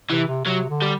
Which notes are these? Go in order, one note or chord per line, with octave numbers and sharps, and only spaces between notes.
C3 E3
C3
C3 F#3
D3
G3